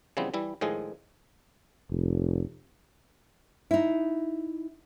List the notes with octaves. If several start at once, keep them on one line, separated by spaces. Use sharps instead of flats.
C#3 E3 F3 G3 B3 C4
E3 G3 E4
A2 D#3 F3 G#3 G#4
F1
D#4 E4